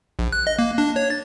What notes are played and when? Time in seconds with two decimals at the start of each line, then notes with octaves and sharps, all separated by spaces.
0.19 A#1
0.33 F#6
0.47 D#5
0.59 A#3
0.78 D4
0.96 C#5
1.10 A6